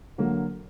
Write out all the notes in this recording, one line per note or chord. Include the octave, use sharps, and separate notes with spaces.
D3 F#3 A#3